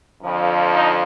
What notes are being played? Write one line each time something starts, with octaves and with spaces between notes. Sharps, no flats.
F2 D3 F3
D#4